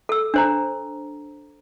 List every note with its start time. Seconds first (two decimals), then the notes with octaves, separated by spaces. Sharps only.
0.09 A4 E6
0.34 D4 C5 A#5